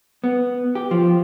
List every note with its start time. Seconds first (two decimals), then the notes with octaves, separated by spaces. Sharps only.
0.24 B3
0.75 G4
0.91 F3